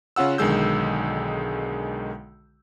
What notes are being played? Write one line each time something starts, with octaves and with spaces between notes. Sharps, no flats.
C#3 C#4 F4 F#5 E6
B1 D3 D#3 G#3 E6 G6